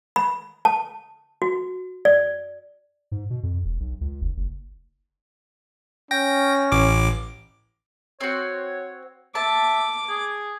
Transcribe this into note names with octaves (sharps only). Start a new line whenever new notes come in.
B5
A5
F#4
D5
G#2
B2
F2
E1
B1
C#2
F1
F#1
C#4 G5 A#6
A1 D6
C4 F#4 C#5
E5 A5 D6
G#4